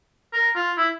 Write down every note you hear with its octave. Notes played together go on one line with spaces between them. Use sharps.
A#4
F4
E4